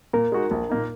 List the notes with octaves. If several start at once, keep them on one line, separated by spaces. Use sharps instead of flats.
A#2 A#4
G#3 D#4 F#4
A#1
A#2 A#3 D#4